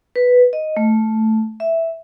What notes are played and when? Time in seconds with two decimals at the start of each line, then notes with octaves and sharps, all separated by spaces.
0.16 B4
0.53 D#5
0.77 A3
1.60 E5